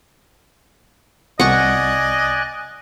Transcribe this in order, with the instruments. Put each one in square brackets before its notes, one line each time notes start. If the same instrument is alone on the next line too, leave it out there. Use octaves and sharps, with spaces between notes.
[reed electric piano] C2 [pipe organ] D5 G#5 F#6 [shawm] D#5 [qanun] F#5 C#6